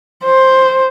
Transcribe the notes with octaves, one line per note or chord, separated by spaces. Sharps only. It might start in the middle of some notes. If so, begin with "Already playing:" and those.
C5